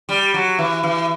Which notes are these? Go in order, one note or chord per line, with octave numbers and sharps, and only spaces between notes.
G3
F#3
E3
E3